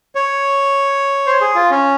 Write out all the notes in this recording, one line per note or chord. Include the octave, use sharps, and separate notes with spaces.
C#5
C5
G#4
F4
C#4